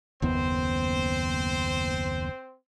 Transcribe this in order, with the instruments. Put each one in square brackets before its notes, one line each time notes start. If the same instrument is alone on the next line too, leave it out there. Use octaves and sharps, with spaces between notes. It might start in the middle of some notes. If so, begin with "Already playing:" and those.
[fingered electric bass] F#1 D#2 B3 [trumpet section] C4 C5